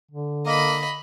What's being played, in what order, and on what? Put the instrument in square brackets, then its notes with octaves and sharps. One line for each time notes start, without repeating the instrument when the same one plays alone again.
[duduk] D3
[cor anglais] A#3 [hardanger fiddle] D#5 B5